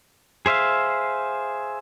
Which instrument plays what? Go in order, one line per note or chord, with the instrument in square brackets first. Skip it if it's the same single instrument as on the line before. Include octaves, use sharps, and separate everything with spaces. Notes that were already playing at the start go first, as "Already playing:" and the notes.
[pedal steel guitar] G#4 C5 E5 F5